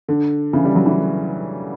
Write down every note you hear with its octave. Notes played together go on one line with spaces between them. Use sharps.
D3
C#3 E3
G3
F#3
E3